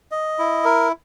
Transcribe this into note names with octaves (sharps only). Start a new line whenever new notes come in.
D#5
E4
A#4